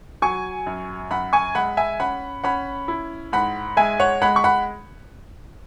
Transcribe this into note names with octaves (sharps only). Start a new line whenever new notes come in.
F#3 G#5 C#6
F#2
F#2 F#5 B5
G#5 C#6
G#3 F#5 B5
E5 G#5
C#4 F#5 B5
C#4 F#5 B5
E4
G#2 F#5 B5
G#3 E5 G#5
C#5 F#5
G#3 F#5 B5
C#6
F#5 B5